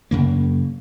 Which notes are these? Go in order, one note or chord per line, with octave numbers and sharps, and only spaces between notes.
F#2 C#3 A#3